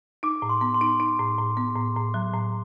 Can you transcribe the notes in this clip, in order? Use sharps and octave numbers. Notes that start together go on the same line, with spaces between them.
D#4 D6
A2
C6
B3
C6
D#4
D#4
A2
A2
B3
A2
A2
F#3
A2